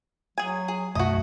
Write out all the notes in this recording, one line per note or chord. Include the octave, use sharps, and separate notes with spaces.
F#3 G#4 G#5
G#4
B1 F#2 A3 F#4 D#5